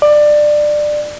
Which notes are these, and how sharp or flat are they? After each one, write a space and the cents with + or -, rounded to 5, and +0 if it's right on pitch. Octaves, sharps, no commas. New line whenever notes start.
D5 +20